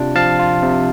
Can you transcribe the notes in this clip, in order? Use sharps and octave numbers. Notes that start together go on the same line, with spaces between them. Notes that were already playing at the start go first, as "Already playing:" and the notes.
Already playing: C3 D4 F4
F3 F5 A5
F4
C3